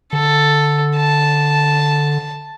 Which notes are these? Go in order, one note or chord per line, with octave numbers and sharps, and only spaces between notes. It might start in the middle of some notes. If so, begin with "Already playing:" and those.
D3 A4
A5